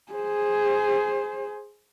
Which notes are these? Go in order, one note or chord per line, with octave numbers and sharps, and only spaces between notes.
G#4 C5